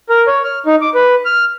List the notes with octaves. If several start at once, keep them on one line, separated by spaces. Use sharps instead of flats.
A#4
C#5
F6
D#4
D6
B4
F6